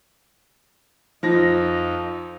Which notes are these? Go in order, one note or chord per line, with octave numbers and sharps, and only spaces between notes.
F2 F3 D#4 A#6